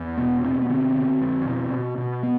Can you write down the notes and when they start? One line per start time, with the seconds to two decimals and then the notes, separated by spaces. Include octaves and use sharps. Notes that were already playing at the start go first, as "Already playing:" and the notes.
Already playing: E2
0.17 B2 B3
0.44 B2 C4
0.61 B3
0.69 D3 C4
0.95 D3
1.21 F2
1.45 B2
1.72 B2
1.98 B2
2.23 B3